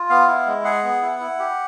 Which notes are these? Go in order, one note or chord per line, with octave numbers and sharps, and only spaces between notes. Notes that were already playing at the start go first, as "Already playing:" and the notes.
Already playing: F4
B3 F5
E4
G#3
G#4 F#5
B3
E4
E4
G4